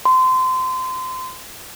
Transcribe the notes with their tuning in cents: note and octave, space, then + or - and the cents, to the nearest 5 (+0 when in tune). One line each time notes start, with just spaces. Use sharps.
C6 -25